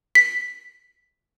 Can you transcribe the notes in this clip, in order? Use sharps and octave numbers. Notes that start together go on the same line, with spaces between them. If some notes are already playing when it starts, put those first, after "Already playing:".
B6